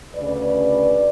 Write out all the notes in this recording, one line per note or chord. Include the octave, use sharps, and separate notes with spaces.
D2 C#3 B4 D5